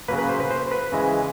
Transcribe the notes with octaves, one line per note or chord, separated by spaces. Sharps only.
C#3 F#3 A#3 B4
B4
C5
B4
C5
B4
C#3 E3 G#3